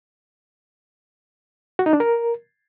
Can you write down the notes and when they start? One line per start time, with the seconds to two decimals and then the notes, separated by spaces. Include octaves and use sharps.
1.79 F#4
1.86 D#4
1.93 D4
2.00 A#4